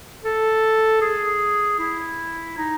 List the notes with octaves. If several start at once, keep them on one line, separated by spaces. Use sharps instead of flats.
A4
G#4
E4
D#4